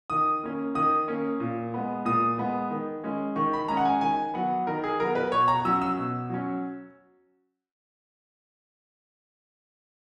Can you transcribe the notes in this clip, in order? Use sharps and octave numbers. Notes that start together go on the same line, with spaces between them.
D#3 D#6
A#3 C#4
D#3 D#6
A#3 C#4
A#2
G#3 B3
A#2 D#6
G#3 B3
D#3
G#3 C#4
D#3 C#6
B5
G#3 C#4 A#5
F#5
G#5
D#3 G#5
F#3 B3 F#5
D#3 A#4
G#4
F#3 B3 A#4
B4
B2 C#5
A#5
F#3 C#4 E6
E6
B2
F#3 C#4